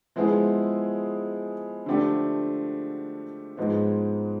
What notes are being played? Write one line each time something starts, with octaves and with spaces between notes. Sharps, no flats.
F3 G#3 B3 E4 G#4
D3 F3 A3 D4 G4
G#2 F3 G#3 B3 D#4